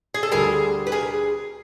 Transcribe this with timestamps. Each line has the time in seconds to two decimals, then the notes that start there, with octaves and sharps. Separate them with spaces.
0.14 G#4
0.23 A4
0.32 D2 D3 G3 G#4 A#4
0.87 B4
0.92 G#4 A#4